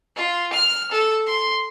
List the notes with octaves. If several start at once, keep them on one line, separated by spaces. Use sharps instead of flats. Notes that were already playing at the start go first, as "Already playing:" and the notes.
F4
F6
A4
C6